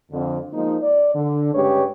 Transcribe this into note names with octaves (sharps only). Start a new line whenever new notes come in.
F2 D3
F3 G#3 A#3 D#4
D5
D3
G2 C#3 G#3 G4 B4 C#5